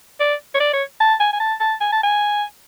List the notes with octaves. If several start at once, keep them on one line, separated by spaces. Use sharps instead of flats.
D5
C#5
D5
C#5
A5
G#5
G#5
A5
A5
G#5
A5
G#5